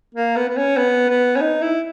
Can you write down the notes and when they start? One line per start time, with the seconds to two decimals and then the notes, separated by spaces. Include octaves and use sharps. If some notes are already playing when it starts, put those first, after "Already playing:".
0.15 A#3
0.36 B3
0.48 B3
0.57 C#4
0.77 B3
1.09 B3
1.36 C#4
1.41 D#4
1.62 E4